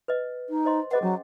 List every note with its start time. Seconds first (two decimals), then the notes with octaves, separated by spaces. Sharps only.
0.08 B4 D#5
0.49 D#4
0.65 C5 D#5 C6
0.91 G#4 B4 D#5 F#5
1.02 F#3 C#4